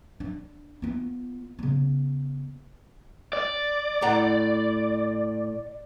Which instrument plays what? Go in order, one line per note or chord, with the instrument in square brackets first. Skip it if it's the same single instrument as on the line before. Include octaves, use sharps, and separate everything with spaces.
[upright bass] D4
B3 F4
C#3 B3
[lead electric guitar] D5
[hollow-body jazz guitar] A2 F#5 A#5